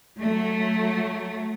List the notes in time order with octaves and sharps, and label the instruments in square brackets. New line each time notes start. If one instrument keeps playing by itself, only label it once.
[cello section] F#3 A3